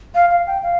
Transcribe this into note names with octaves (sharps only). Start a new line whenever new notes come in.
F5
F5
G5
F5